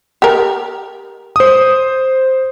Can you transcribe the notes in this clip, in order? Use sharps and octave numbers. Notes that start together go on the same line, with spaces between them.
G4 A#4
C5 D#6